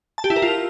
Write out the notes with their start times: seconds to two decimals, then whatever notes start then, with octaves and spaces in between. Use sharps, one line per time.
0.18 A5
0.24 G4
0.30 E4
0.36 A#4
0.42 F4